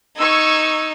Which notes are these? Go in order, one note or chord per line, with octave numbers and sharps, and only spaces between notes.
D#4 C#6 E6 G#6